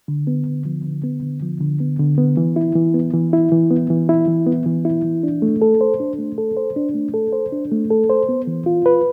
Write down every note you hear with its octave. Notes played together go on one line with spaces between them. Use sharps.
D3
B3
D3
F3
D3
B3
D3
F3
D3
B3
D3
B3
E3
E4
E3
B3
E3
E4
E3
B3
E3
E4
E3
B3
E3
E4
E3
D4
A3
A4
C5
D4
A3
A4
C5
D4
A3
A4
C5
D4
A3
A4
C5
B3
E3
F4
B4